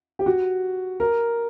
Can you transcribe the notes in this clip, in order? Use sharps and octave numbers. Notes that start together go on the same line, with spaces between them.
G4
F#4
A#4